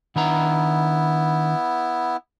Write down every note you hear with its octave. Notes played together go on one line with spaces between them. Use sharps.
D#3 B3 D4 E4 A#5